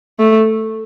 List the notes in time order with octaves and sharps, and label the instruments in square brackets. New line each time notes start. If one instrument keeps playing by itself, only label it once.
[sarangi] A3